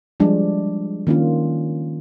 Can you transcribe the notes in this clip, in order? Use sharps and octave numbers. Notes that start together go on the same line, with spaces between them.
F3 G3 G#3 D4
D#3 A#3 C#4 D4 F4